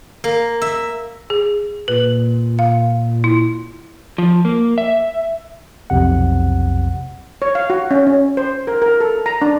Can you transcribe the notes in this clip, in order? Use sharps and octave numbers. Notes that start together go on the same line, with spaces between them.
A#3
E5
G#4
A#2 B4
F5
E4
F3
A#3
E5
B1 F2 C3 F#5
C#5
F5
F#4
C#4
C#4
C5
A#4
A#4
A4
A#5
D4